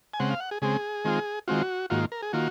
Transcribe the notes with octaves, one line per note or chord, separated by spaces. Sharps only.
G#5
C#3 G#3 C4 F#5
F5
F#5
G#4
C#3 G#3 C4 G#4
D#3 G#3 C4 F4
D#3 G#3 C4 F4 F#4
G#2 D#3 A#3 F4 F#4
A#4
G#4
D#3 A#3 F4 F#4